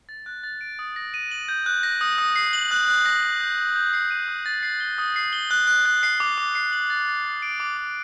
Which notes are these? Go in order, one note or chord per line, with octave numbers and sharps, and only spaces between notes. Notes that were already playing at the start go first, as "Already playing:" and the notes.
A6
F#6
A6
D7
D#6
A#6
D#7
F#7
G6
F#6
A#6
D#6
D#6
C7
F#7
F#6
F#6
A#6
F#7
G6
G6
G6
C7
D#7
D#6
A6
C7
G7
D#6
C7
G7
F#6
F#6
F#6
C7
D6
D6
C7
F#7
A6
A6
A6
D7
D6
D6